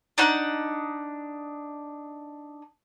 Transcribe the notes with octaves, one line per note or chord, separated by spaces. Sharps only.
D4 D#4 F#5